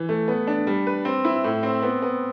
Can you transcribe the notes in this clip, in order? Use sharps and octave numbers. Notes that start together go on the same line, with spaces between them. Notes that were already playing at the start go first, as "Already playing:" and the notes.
Already playing: E3
A3
B3
D4
G3
B4
C4
E4
A2
C4
B3
B3